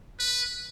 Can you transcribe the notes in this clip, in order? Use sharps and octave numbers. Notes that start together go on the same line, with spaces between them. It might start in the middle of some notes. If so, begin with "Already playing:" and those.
B4